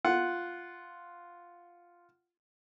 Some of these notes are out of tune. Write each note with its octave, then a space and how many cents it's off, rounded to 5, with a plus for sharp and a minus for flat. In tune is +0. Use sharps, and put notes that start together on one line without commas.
F4 +0 F#5 +0